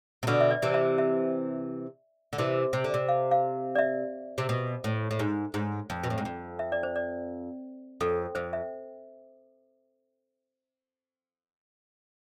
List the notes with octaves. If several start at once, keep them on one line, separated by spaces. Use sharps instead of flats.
C3
B2 D3 B4
E5
D5
C3 E3
E5
E5
D3
C3 E3
C3
D3
C3
F5
F5
D5
E5
C3
B2
A2
A2
G#2
G#2
F2
B2
A2
G#2
F2
E5
D5
C5
D5
F2 A4
F2 C5
E5